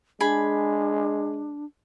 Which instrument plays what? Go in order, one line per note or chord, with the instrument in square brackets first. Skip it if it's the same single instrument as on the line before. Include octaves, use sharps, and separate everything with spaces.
[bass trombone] G#3 [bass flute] D4 [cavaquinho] G#4 B5